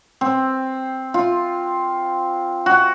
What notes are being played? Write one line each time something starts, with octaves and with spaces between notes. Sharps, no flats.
C4
F4
F#4